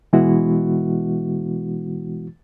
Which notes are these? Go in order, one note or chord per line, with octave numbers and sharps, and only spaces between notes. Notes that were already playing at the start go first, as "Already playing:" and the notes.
B2 E3 G#3 B3 E4 F#4